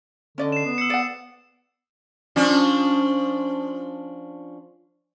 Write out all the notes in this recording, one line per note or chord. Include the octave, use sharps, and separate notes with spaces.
D3 C#4 D5 D#5
C7 E7
B3
E6 C7 C#7
D5 F#5
F3 C#4 D4